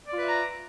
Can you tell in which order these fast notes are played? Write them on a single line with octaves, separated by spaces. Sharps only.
D5 F4 B4 E5 A#5